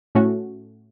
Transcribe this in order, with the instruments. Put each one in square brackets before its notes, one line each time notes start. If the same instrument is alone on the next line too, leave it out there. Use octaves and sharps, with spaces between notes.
[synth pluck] A2 A3 C#4 F#4